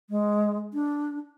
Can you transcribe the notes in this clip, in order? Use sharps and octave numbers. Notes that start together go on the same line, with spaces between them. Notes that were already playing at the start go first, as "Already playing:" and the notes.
G#3
D4